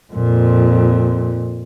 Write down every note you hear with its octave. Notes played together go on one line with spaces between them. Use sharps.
F2 A#2